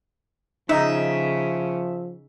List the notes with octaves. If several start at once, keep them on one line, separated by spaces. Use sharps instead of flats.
C#3 F3 D#4 E5